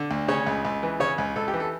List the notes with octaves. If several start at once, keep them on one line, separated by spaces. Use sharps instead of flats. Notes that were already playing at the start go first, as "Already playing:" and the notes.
Already playing: D3
D2
C#3 C#5
C#2
C#2
E3
C#3 C#5
C#2
C#2 A4
G4
E3
A4